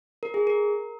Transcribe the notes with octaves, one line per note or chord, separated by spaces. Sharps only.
A#4
G#4
A#4